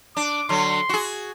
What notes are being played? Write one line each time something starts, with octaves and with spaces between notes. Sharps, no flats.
D4 D6
D3 F#3 C6
F#4 G#4